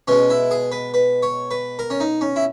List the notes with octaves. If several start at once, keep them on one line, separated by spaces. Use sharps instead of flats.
B2 G#3 C#4
E4
G#4
B4
B4
C#5
B4
A#4
C#4
D#4
C#4
E4